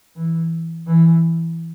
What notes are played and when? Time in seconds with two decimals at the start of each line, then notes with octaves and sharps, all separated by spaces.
0.16 E3
0.87 E3